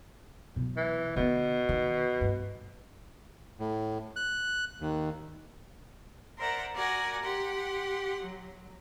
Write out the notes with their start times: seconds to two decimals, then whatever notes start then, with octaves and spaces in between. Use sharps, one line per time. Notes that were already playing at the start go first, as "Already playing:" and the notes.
0.56 B2 F#3
0.77 E3
1.16 B2 D3 B3
1.69 D#3
2.21 G2
3.60 A2
4.16 F#6
4.81 D#2
6.38 A#4 C5 D5 E5 F#5 A#5
6.74 F#4 A#4 D5 F#5 G#5
7.22 G4 F#5 C6
8.23 F#3